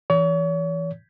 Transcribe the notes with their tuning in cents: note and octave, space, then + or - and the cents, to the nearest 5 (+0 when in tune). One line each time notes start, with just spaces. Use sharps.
E3 +10 C#5 +40